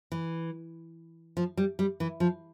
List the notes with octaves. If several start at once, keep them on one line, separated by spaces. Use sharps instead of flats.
E3
F3
G3
G3
E3
F3